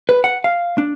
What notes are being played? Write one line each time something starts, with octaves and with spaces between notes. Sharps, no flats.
B4
F#5
F5
D4